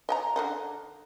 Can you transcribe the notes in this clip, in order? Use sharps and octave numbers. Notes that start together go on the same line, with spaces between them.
D#5 G5 A#5
D3 D#3 D#4